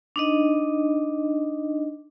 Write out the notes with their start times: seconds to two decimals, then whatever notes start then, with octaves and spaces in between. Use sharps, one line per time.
0.16 D4 D#4 D#5